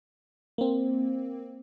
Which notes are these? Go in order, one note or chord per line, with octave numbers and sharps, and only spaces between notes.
A#3 C4